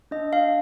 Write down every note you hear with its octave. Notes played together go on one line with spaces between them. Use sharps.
D4 D#5
D4 F5